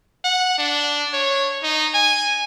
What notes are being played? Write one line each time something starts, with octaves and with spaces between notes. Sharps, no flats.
F#5
D4
C#5
D#4
G#5